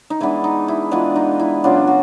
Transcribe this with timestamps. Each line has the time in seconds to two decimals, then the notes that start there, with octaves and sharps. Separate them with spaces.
0.10 D#4
0.20 E3 G#3 B3 D4 E4
0.44 D#4
0.68 E4
0.91 E3 G#3 B3 D4 F4
1.16 D#4
1.40 E4
1.64 C#3 F#3 B3 D4 F4
1.87 F#4